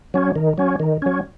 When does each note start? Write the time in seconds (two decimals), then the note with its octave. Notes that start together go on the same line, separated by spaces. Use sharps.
0.14 F#3 C#4
0.36 D#3
0.58 F#3 C#4
0.80 D#3
1.02 F#3 C#4